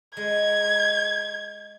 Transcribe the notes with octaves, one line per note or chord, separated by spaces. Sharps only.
G#3 G#6